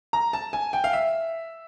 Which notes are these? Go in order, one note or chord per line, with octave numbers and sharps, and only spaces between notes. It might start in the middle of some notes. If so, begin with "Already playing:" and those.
A#5
A5
G#5
G5
F5
E5